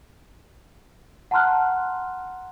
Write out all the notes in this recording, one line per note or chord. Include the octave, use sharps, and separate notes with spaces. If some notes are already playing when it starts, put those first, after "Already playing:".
F#5 A5 A#5 C6 F6 F#6